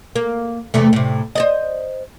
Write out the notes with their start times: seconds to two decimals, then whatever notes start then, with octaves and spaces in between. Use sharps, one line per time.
0.16 A#3
0.74 E2 C3 A3
0.93 A2 C3
1.35 C5 D5 D#5